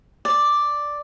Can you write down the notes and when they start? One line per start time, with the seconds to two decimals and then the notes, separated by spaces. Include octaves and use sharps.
0.25 D5